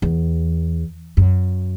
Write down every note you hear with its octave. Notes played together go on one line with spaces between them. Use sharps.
E2
F#2